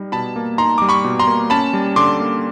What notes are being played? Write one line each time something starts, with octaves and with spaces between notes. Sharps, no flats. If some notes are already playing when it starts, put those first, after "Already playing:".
Already playing: G3 D#4
B2 A5 B5
A#3
D#4 A#5 C6
G3 D6
B5 C#6
B2
A#5 C6
A#3
C#4 A5 B5
G3
D3 C6 D6
A#3